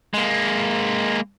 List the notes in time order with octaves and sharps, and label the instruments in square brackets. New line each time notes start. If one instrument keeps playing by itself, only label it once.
[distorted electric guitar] G#3 A#3